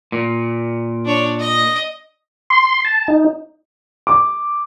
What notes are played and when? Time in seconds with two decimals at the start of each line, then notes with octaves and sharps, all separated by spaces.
0.12 A#2
1.05 D4 C#5
1.39 D#5
2.50 C6
2.85 A5
3.08 D#4
4.07 D6